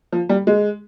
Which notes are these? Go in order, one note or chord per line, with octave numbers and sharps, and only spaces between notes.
F3
G3
G#3